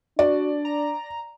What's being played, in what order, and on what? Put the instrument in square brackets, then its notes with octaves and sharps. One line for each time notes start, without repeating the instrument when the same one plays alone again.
[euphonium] D4 [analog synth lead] F#4 [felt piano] D5
[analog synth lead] A#5